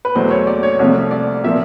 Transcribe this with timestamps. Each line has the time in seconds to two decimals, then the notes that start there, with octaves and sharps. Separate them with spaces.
0.05 B4
0.15 E2 B2 F#3 A3 C5
0.31 C#5
0.47 D5
0.63 C#5
0.79 C2 C3 F3 A3 C#5
1.11 D5
1.44 A#2 F3 A#3 E5